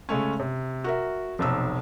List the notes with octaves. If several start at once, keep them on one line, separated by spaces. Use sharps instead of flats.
C#3 G#3 A3 C#4
C3
F#4 A#4 E5
F1 B1 E6